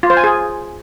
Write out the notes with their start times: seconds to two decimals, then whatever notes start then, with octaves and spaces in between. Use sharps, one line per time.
0.03 F4
0.10 C5
0.17 G#5
0.24 G#4